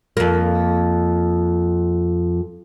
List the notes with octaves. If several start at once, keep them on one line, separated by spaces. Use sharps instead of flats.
F2 A#3